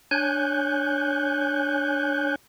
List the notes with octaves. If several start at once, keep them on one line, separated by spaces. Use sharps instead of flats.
D4 C#5 G#5 F#6 G6